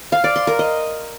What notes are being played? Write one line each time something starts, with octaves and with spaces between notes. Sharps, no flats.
F5
D5
C6
A#4
D#5